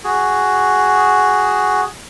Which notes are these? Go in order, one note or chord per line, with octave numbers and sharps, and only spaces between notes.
F#4 G#4